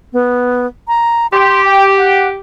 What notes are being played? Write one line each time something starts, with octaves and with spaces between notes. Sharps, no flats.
B3
A#5
G4 C6
G5
F#5